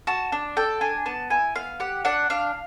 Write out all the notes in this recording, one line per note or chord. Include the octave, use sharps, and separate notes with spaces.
F#4 A5
D4
A4 G5
D4 G#5
B3 A5
E4 G#5
B3 F5
G4 F#5
D4 F#5
D4 F5